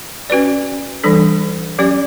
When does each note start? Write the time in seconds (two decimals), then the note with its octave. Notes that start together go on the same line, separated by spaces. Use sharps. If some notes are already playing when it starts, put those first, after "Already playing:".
0.30 C#4 F#4 B4 D5
1.04 E3 G3 D4 A4
1.79 F#3 C#4 G4 D5